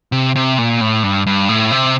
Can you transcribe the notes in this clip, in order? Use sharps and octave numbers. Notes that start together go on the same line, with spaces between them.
C3
C3
A#2
A2
G2
G2
A2
C3